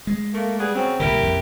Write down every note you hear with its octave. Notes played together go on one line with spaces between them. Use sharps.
G#3
A3 A#3
G3 B3 G#4
C#3 F#3 C4
C2 A#2 D3 E4 G4 A#4
A#1 F2